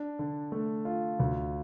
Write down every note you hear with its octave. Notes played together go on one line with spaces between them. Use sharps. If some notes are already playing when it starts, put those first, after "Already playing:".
Already playing: D4
D3
A3
F4
D2